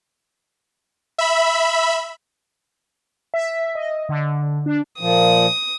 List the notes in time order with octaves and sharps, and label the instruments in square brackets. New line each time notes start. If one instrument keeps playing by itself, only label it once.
[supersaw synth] E5 B5
[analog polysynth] E5
D#5
D3
D4
[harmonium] A#2 F3 [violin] D#6